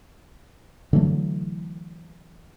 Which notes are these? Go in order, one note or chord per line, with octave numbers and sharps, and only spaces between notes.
D3 E3 F#3 A3